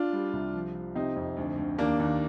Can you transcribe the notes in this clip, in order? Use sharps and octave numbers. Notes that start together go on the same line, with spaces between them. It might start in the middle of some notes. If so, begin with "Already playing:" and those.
Already playing: D4 F4
G3
C2
F3
F3
C3 C4 D#4
F2
D2
D2
D#2 A#3 D4
D#2